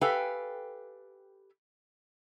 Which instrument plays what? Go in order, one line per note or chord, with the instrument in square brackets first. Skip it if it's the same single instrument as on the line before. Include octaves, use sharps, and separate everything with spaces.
[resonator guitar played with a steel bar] G4 A4 B4 F5 G5 G#5